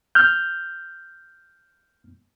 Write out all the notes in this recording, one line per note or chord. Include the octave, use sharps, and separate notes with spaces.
F6 G6